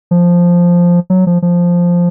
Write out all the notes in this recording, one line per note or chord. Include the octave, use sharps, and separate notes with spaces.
F3
F#3
F3
F3